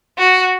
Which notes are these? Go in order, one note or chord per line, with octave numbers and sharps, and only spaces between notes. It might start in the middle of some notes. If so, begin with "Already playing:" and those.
F#4